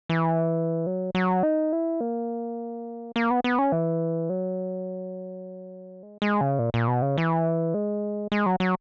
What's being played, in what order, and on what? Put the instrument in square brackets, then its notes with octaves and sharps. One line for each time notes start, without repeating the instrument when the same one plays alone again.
[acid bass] E3
F#3
F#3
D#4
E4
A#3
A#3
B3
B3
C#4
E3
F#3
G#3
G#3
C#3
A#2
A#2
B2
C#3
E3
G#3
G#3
F#3
F#3